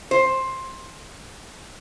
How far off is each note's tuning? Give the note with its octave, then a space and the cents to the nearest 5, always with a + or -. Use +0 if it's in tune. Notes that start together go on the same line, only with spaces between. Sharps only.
C5 +15